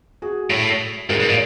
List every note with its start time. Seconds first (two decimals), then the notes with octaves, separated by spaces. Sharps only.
0.22 F#4 G#4
0.50 A2
1.09 G#2 G#4 A#4
1.20 G#2
1.29 A#2